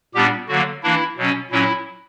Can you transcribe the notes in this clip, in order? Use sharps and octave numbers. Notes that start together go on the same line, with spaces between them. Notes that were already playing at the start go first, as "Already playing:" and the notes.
A#2 G3 B3 D4 G4
D3 F#3 A#3 F#4
E3 A#3 D4 E4
B2 F#3 C#4
A#2 F#3 C#4 E4